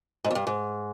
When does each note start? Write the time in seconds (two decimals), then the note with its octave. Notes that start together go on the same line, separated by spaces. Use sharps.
0.24 G#2
0.31 F2
0.35 G2
0.47 G#2